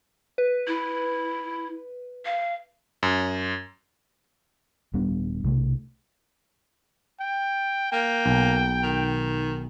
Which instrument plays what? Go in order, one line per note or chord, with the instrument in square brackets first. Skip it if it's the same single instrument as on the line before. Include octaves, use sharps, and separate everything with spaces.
[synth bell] B4
[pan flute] E4
F5
[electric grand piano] F#2
[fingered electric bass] D#1 G3 B3 D4
B1 C3 A3
[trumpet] G5
[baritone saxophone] A#3 [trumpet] G5
[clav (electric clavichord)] B1
[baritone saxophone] D#3